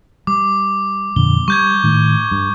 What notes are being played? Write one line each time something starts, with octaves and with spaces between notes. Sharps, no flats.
G3 D6
F2 A#2 D3 G7
G3 C#6 G6 G#6
A2 D#3
G2